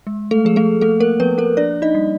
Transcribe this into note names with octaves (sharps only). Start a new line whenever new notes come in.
G#3
A3 A4
F3 G#4
A3 A4
A3 A#3 A4
A#3 A#4
F3 B3 B4
A#3 A#4
A#3 D4 D5
D#4 D#5
G3